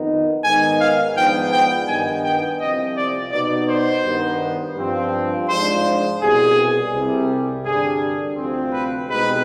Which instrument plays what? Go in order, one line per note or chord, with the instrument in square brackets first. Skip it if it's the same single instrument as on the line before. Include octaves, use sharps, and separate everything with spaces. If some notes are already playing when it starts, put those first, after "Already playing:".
Already playing: [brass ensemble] F2 D#3 B3 D#4
G#2 D#3 B3 D#4 G#5
F5
G#2 F3 B3 D4 G5
G5
G2 D#3 B3 D#4 G#5
G5
C2 C3 F3 D#5
D5
B2 B3 D#4 D5
C5
G2 D#3 B3 D#4
G2 F3 C4
G#2 F3 G#3 D4 C5
C2 B2 G3 G#4
C2 C3 G3
G2 D3 G3 D4 G#4
D2 C3 F3 C4
B4
C2 B2 G#3 C4 D#4 B4